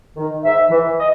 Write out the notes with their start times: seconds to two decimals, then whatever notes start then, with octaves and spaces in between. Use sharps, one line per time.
0.17 D#3
0.44 G#2 E5
0.70 E3
0.98 D#5